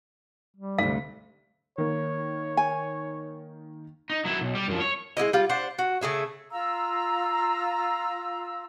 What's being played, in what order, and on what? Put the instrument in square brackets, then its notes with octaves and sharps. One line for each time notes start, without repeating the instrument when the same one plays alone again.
[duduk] G3
[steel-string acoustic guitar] D2 C3 A3 [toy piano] F5
[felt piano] D#3 A#3 [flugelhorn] C#5
[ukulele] G#5
[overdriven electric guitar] D#4
F#3 E4
B1
G3
F#2 F3
C#5
[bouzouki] G#3 D#4 E4 D#5
G3 F4
D4 C5 F#5
F#4
C#3 A3 G#4 E5
[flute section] F4 F5 A#5 E6